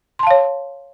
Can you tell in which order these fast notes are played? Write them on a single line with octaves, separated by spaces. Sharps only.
C6 A5 F5 C#5